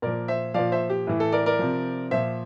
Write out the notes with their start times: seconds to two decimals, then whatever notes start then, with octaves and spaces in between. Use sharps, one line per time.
0.02 A#2 F3 A#4 D5
0.28 C5 E5
0.54 A#2 F3 D5 F5
0.72 C5 E5
0.90 G4
1.07 A2 E3
1.20 A4
1.32 A#4 D5
1.46 A#4 D5
1.59 C3 F3
2.11 A#2 F3 C5 E5